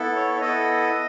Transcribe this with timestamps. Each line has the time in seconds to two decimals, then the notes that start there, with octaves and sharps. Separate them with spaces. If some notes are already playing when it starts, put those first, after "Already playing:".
Already playing: B3 E4 A4
0.16 C#5
0.36 C#5
0.41 B3 E4 A4 D#5